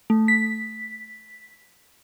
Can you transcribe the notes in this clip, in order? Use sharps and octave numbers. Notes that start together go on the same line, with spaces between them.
A3
B6